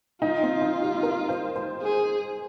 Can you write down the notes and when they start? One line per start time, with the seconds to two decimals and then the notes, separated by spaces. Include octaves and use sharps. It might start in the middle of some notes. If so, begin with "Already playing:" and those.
0.22 D#4 F4
0.43 C4
0.62 D#4
0.82 G4
1.03 A#4
1.29 C5
1.56 C5
1.82 G#4